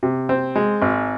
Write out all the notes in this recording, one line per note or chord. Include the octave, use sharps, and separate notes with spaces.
C3
C4
G#3
G#1